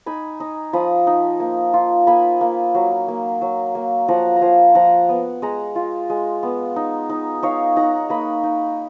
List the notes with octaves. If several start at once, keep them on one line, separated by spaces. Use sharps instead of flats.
D#4 G#5 B5
D#4
F3 B5 D#6
D#4
A#3
F4
A#3 G#5 B5
A#3
F#3
A#3
F#3
A#3
F3 F#5 A#5
A#5
F3 F5 G#5
F3 F#5 A#5
B3
G#3 F#5 A#5
F4
G#3
B3
D#4
D#4
D#4 C#5 F5
D#4 F#5 A#5
A#3 B5 D#6
D#4